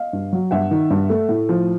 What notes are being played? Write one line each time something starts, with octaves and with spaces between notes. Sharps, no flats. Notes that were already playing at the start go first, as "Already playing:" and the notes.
Already playing: D#5 F5
G2
F#3
G2 E5 F#5
D#3
G2
A3
A2
F3